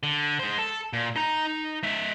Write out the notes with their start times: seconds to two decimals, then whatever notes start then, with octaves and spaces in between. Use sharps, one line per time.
0.03 D3
0.39 G#3 C5
0.59 A4
0.93 A#2
1.16 D#4 A#5
1.83 G#3 E5